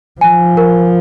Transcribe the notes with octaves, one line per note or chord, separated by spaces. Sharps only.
F3 G#5
A#4